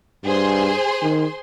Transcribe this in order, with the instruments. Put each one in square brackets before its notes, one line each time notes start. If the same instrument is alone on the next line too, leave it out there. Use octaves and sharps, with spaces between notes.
[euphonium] G2 [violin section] G#4 C5 C6
[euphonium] D#3